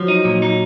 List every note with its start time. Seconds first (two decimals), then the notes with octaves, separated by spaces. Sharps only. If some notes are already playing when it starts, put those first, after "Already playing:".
Already playing: F3 F#3
0.08 D#4
0.24 A#2
0.42 D#4